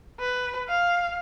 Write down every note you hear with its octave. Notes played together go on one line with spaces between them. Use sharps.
B4
F5